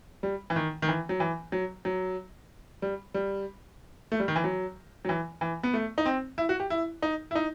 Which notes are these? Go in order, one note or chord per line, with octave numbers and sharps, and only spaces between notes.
G3
E3
D#3
D#3
E3
F#3
E3
F#3
F#3
G3
G3
A3
G3
D#3
E3
F#3
F#3
E3
E3
B3
A3
D#4
C4
E4
F#4
G4
E4
D#4
E4
D#4